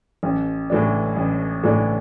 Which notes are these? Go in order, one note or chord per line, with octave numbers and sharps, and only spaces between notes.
A1
A2 E3 A3 D4
A1
A2 E3 A3 D4